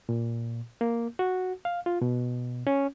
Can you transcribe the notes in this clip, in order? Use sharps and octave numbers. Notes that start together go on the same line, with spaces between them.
A#2
A#3
F#4
F5
F4
B2
C#4